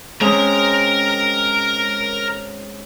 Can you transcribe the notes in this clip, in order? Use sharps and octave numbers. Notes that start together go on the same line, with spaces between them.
G#3 C4 C#4 A#4 A#5